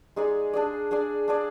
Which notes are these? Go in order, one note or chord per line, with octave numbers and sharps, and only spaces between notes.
G#3 D#4 G#4 D5
D4 G#4 D5
D4 G#4 D5
D4 G#4 D5